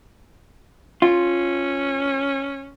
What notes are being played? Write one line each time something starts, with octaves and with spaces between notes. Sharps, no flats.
C#4 F4